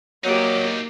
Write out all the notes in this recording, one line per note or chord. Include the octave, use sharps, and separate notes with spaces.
F#3 A#3 D#4 G4 D5